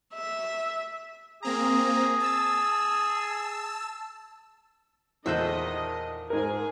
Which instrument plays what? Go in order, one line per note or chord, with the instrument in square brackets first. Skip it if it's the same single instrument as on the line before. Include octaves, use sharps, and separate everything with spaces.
[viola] E5
[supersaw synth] A#3 C4 A#5 [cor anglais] G#4
[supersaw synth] A5 E6
[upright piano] E2 A#2 F#6 [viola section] D#3 D#5 [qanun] A4 C5 E5
[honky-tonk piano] G#2 A#4 [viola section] G#4 G#5